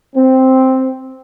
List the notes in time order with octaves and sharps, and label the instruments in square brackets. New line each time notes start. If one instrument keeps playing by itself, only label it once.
[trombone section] C4